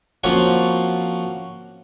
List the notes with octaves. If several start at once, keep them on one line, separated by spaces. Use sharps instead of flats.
F3 A#3 C4 C#4 F4 F#4